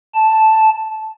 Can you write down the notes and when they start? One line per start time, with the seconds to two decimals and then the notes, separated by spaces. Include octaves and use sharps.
0.15 A5